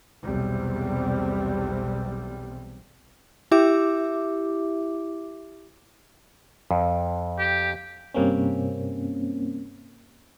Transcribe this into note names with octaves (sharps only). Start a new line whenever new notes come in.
B1 E2 C3 G3
E4 G4 E5 D6
F2
G4
G2 C3 A#3 C4 C#4